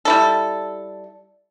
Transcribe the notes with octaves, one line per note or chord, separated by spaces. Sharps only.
G3 E4 A4